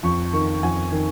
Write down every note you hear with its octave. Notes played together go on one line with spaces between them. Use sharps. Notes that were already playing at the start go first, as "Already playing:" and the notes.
F2 C#6
D#3 C#6
F2 G#5
D#3